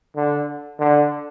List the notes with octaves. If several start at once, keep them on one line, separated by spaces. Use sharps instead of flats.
D3
D3